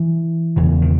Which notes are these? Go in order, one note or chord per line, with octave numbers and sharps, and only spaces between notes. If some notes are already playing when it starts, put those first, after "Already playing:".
Already playing: E3
E1 E2 C#3
D#3